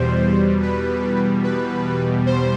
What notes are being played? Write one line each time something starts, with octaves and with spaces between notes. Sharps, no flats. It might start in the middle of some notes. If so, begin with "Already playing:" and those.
Already playing: E2 B2 G3 C5
B4
B4
C5